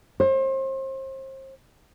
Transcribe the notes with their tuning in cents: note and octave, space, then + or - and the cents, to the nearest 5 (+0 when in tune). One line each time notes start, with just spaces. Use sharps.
C5 +35